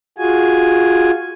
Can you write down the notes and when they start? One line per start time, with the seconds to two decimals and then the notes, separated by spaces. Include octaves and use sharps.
0.18 F4 F#4 G#4 G#5